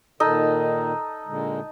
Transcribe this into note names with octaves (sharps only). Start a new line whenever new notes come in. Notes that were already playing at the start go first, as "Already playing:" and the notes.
A#2 D#3 D#4 A4
A#2 D3 G#3